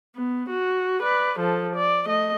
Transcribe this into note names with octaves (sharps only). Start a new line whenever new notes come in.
B3
F#4
B4 D5
F3 A4
D5
A3 D#5